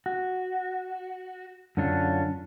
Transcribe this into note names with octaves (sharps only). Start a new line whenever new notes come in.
F#4
F#2 D3 C#4 D4 F4